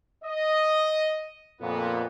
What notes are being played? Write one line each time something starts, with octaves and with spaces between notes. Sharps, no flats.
D#5
F2 A#2 B3